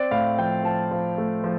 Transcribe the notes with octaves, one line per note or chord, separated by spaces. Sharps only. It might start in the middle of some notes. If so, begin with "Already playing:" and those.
Already playing: C4 D5
A2 F5
F3 G5
F3 A5
F3
A3
F3